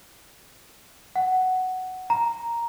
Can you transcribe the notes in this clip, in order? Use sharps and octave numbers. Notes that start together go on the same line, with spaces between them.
F#5
A#5